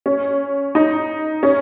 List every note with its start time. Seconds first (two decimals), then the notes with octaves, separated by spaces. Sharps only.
0.06 C#4
0.75 D#4
1.43 C#4